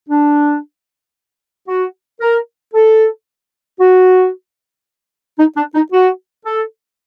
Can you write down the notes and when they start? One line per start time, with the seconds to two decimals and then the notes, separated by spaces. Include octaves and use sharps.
0.09 D4
1.68 F#4
2.21 A#4
2.74 A4
3.80 F#4
5.39 D#4
5.57 D4
5.75 D#4
5.92 F#4
6.45 A4